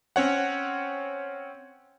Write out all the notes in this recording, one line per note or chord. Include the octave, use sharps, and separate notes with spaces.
C4 C#4 C#5 F#5